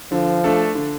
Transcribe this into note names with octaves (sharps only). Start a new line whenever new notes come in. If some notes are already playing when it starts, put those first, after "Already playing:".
D3 F3
A3 D4 A4
D3